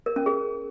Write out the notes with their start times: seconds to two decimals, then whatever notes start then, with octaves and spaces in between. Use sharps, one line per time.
0.06 A#4
0.16 C#4
0.26 G#4